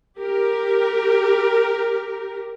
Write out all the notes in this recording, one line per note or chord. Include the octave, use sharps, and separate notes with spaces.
G4 A#4